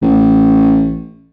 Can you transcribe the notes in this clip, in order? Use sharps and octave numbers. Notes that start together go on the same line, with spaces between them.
A1